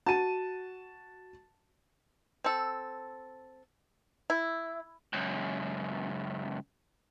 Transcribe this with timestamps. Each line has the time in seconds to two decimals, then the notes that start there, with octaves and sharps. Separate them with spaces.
0.06 F#4 A5 D#7
2.44 C4 A4
4.30 E4
5.13 C#2 F#2